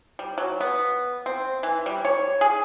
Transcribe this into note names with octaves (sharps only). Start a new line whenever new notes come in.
G3
F#3
B3
C4
E3
G3
C#5
G#4